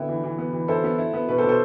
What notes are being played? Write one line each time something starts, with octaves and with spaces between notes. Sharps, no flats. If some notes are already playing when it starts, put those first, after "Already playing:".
Already playing: D3 B3 E4 E5 G5
E3
E3
B3
E3
E4 A4 C5
B3
E4
B3
B2 B4
A4 C5
B2
A4 C5